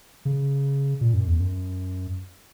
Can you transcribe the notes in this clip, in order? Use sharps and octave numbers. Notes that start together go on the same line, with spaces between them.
C#3
A#2
F#2
E2
F#2